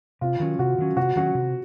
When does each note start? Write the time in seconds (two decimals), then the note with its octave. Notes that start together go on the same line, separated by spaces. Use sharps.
0.21 C3 F4
0.40 D#3 F#3 C#4
0.59 C3 F#4
0.78 D#3 F#3 C#4
0.97 C3 F#4
1.16 D#3 F#3 C#4 F#4
1.35 C3